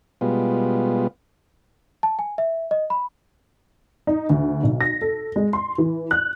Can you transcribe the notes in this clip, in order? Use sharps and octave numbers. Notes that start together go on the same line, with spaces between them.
B2 G3 G#3 B3 F4
A5
G#5
E5
D#5
B5
D#4
D2
B1
A#6
A4
G#3
C6
E3
F#6